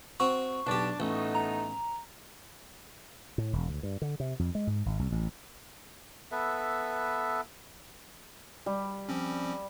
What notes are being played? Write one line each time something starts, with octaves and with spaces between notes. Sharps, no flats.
C4 F#4 C#6
B1 D4 G4 D5 A5
A1 A3 B3 D#4
A#5
A2
E1
D2
G2
D3
C3
F2
G#3
G#2
G#1
C2
A1
B3 A4 B4 E5
G3
F3 C4 C#4